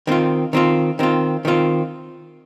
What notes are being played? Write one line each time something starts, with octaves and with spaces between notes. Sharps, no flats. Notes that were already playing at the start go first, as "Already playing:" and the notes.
D#3 C4 F4
D#3 C4 F4
D#3 C4 F4
D#3 C4 F4